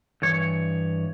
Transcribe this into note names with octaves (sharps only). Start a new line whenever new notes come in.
G2 E3 C#5